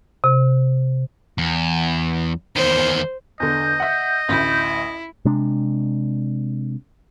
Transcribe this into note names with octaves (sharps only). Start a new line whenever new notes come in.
C3
E2
E2 D#3 C5
E2 D3 D#5 G6
E5 F#5
A1 D2 E4
C3 G#3 D4